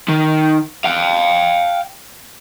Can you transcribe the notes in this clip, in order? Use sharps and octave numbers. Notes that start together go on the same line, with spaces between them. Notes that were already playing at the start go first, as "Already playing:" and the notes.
D#3
F5 G5